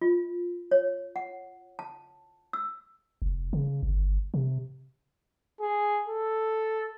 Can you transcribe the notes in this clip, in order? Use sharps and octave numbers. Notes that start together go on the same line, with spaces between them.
F4
C#5
F#5
A5
E6
F1
C#3
G1
C3
G#4
A4